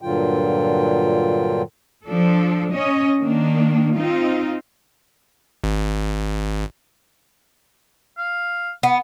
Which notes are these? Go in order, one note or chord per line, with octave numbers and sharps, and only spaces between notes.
G2 A#2 D3 F#3 F4 G5
F3 D4 A4
C#4 C#5 D#5
D#3 A#3 D4
C4 D#4 F4
G#1
F5
B3